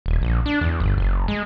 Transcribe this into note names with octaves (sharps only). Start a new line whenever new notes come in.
D#1
A#1
D4
E2
G1
F#1
G#3